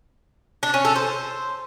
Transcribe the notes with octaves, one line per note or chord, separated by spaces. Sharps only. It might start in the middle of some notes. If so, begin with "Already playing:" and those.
D4
C#4
A4
C5